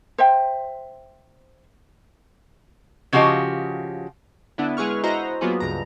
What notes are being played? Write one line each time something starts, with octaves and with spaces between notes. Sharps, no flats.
C5 E5 G5
C#3 F3 F#4 G4 D#5
D3 B3 D4 E4
G#3 E4 G#4 B4 C#6 F6
E4 F#4 C5 D#5 A#5
F#3 A#3 B3 F4 F#4 G#4
C#2 G2 A#5